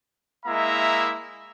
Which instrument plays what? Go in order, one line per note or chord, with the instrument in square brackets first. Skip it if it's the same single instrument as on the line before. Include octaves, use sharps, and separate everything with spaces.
[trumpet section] G#3 A#3 E4 E5 A#5